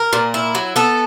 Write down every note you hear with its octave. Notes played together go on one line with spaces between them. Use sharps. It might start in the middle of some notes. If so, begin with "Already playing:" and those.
Already playing: A#4
A#2
E4
F#3
B3 A4